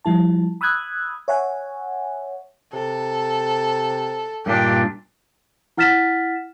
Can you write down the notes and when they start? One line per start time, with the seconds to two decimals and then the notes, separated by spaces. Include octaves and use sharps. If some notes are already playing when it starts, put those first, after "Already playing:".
0.05 F3 G3 E4 A5
0.61 B5 D#6 E6 F#6 G#6
1.28 C#5 E5 F#5 G#5
2.73 C3 A4
4.46 G2 A#2 D#3 D4 G4
5.77 E4 F#5 F6 A6 B6 E7